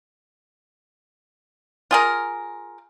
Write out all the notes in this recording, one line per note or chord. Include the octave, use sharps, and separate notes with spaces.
F4 G#4 A#4